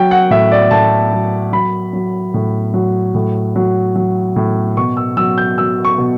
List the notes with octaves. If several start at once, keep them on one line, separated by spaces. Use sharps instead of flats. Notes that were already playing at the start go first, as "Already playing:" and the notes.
Already playing: F#3 G5
F#5
A2 E5
D5
A2 A5
F#3
F#3 B5
F#3
A2
F#3
A2
F#3
F#3
A2
B2 C#6
E6
F#3 E6
G6
F#3 E6
C#6
B2